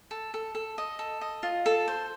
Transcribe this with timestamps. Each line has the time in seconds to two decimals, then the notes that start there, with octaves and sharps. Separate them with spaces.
0.11 A4
0.34 A4
0.55 A4
0.78 D#5
0.99 A4
1.21 D#5
1.43 F4
1.66 A4
1.88 C5